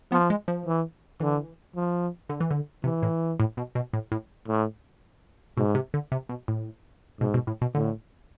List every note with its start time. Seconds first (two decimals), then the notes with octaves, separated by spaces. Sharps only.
0.12 F3 B3
0.30 G#3
0.48 F3
0.66 E3
1.20 D3 E3
1.76 F3
2.29 D3
2.40 E3
2.51 D3
2.84 C3 E3
3.03 A2
3.40 A2
3.57 B2
3.75 B2
3.93 A2
4.12 A2
4.48 A2
5.57 G#2 B2
5.75 C3
5.94 D3
6.12 C3
6.29 B2
6.48 A2
7.20 G#2 B2
7.34 B2
7.47 A2
7.62 B2
7.75 A2 D3